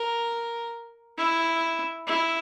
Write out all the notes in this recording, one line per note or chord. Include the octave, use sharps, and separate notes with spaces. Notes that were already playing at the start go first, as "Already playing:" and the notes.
Already playing: A#4
E4
E4